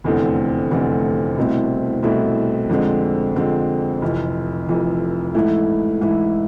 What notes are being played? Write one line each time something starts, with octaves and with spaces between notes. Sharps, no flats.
F1 E2 D3 A3 C4
F1 E2 D3 A3 C4
C2 B2 A3 C4 E4
C2 B2 A3 C4 E4
F2 D3 G#3 C4
F2 D3 G#3 C4
F1 F2 E3
F1 F2 E3
G#2 E3 A3 E4
G#2 E3 A3 E4